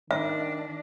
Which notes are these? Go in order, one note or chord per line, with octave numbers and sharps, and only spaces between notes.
D#3 D4 E5